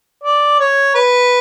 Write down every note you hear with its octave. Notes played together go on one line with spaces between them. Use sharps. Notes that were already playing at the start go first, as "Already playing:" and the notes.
D5
C#5
B4